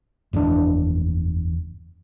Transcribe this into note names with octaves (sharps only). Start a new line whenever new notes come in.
F#1 E2 G2 D4